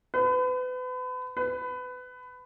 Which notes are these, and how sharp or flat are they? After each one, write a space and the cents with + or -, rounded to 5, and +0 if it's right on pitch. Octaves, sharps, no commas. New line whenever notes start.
B4 +35
B4 +20